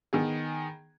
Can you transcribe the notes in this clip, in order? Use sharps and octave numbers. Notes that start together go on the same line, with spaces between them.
D#3 B3 G#4